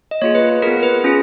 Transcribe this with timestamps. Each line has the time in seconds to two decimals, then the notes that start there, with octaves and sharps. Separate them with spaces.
0.11 D#5
0.22 A#3 F4 G#4 C#5
0.35 B4
0.49 B4
0.62 B3 F4 G#4 A#4
0.83 B4
1.04 C#4 F4 G#4